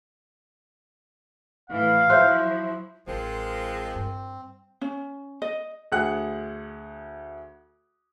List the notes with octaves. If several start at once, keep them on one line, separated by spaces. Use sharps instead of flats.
A2 E3 F5
F3 F#3 E4 C5 E5 C6 F#6 G6
A1 F3 G#3 C4 A#4
G2
C#4
D#5
D2 G#4 F#5 F#6 C#7